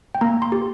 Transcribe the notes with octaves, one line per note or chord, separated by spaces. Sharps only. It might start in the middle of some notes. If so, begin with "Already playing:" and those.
G5
A#3 A#5
C6
G4